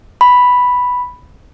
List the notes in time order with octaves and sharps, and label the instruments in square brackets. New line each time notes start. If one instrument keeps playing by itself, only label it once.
[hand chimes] B5